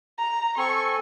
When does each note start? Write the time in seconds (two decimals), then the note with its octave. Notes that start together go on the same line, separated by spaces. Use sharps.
0.18 A#5
0.57 C4 A4 G#5 C#6